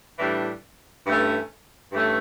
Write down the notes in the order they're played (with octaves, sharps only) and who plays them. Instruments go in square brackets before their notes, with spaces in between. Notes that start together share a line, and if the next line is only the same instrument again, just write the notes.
[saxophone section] A2 E3 G3 D4
G2 E3 A3 C#4
G2 E3 A3 C#4